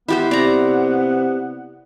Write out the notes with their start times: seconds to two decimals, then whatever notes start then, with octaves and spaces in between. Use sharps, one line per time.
0.08 B3 E4 G4 C5
0.31 C3 D5 A#5